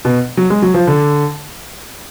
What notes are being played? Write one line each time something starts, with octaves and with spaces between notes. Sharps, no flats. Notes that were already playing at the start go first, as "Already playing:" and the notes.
B2
F#3
G#3
F#3
F3
D3